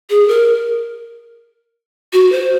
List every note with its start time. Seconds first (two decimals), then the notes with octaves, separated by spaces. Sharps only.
0.10 G#4
0.28 A#4
2.13 F#4
2.32 C5